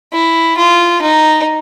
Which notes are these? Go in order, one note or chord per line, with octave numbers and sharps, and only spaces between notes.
E4
F4
D#4